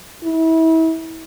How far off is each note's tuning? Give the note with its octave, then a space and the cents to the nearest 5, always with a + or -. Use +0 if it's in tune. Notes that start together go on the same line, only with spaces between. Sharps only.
E4 -30